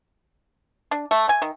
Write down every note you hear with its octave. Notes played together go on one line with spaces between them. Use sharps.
D4
A3
G#5
D#3